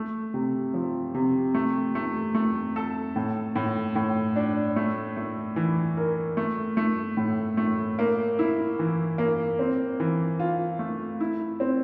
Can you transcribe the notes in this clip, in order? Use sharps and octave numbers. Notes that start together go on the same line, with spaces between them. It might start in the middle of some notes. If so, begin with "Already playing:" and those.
Already playing: A3
C3
F3
C3
A3
A3
A3
A4
A2
A2
A2
D4
A3
A3
E3
A#4
A3
A3
A2
A3
A#3
E4
E3
A#3
C4
E3
F4
A3
E4
C4